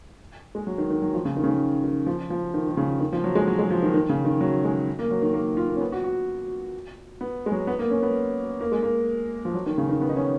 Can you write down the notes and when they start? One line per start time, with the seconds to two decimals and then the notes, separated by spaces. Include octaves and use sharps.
0.55 G#3
0.67 F#3
0.78 D#3
0.90 D#3
1.02 F#3
1.13 F3
1.25 C#3
1.37 D#3
1.43 C#3
1.49 D#3
1.84 D#3
2.06 F3
2.30 F3
2.54 D#3
2.69 D#3
2.77 C#3
3.00 D#3
3.13 F3
3.24 F#3
3.35 G#3
3.47 F#3
3.59 G#3
3.70 F3
3.82 D#3
3.94 D#3
4.09 C#3
4.25 D#3
4.41 F#3
4.64 G#3
4.99 A#3
5.11 F#3
5.22 D#3
5.34 A#3
5.57 F4
5.69 A#3
5.76 C#4
5.81 B3
5.92 F#4
6.04 F#4
7.21 B3
7.46 G#3
7.52 F#3
7.67 B3
7.79 A#3
7.91 C#4
8.03 B3
8.61 A#3
8.72 G#3
8.83 A#3
9.45 F3
9.54 F#3
9.66 D#3
9.78 C#3
9.89 D#3
10.01 B3
10.09 D#4
10.16 C#4